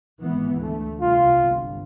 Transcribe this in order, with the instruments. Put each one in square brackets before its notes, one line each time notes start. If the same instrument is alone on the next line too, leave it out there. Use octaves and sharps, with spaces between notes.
[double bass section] G#1 E3 B3
D2 A3
[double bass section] C2 [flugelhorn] F4
[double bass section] G1